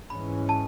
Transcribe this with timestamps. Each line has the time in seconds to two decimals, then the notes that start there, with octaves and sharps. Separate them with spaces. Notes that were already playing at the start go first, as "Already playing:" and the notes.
0.10 G#2 E3 G#3 C#4 B5
0.49 A5